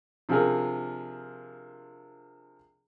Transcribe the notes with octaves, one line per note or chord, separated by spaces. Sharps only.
C3 F3 D4 F4 G#4 A#4